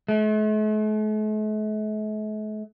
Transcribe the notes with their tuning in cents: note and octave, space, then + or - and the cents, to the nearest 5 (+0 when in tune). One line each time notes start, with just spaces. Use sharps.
A3 -45